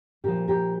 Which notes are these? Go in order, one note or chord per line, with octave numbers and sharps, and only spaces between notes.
A#2 F3 G4 A#4
G4 A#4